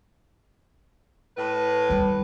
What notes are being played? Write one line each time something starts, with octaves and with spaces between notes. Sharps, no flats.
A2 B4
D#3 G3